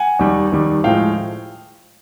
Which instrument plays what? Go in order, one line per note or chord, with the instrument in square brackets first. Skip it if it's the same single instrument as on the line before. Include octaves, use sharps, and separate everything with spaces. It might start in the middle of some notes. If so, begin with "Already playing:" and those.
Already playing: [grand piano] F#5 G#5
D#2 D#3 G3
D#2 D#3 G3
A2 F3 G#3 F5 G5